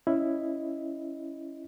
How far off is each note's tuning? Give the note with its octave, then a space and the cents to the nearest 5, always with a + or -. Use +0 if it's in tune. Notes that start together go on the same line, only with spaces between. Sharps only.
C#4 +0 E4 +0 D#5 +0